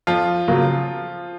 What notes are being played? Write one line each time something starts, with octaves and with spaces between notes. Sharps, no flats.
F2 F3 F4
C#3 F#3 A#3